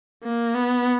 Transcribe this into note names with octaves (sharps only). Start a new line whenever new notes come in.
A#3
B3